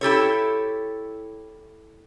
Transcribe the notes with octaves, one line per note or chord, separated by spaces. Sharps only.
E4 G4 A4 C#5